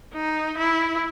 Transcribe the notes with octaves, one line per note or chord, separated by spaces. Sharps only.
D#4
E4